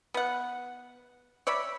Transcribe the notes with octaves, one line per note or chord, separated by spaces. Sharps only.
B3 F#5
C#5 D5 E5 B5